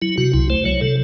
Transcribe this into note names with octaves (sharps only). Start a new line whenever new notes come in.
F#3 E4
C3 F#4
C2 E4
A3 C5
F#3 C#5
C3 A4